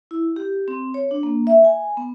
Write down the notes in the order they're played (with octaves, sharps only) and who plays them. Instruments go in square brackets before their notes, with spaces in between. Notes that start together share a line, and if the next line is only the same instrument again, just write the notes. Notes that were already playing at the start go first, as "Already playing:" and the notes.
[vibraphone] E4
G4
C4
C#5
D4
A#3
E5
G#5
B3